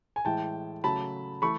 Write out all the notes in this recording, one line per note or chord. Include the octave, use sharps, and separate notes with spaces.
G#5
A2 E3 G#3 G5 A5
C#3 F#3 A3 A5 B5
E3 A3 B5 C#6